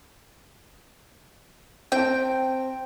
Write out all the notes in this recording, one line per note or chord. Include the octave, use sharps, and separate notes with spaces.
C4 G5 A5